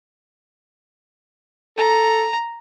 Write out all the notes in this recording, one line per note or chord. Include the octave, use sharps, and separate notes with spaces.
A4 A#5